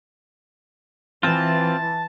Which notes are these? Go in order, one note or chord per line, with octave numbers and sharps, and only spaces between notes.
E3 C4 F4 A5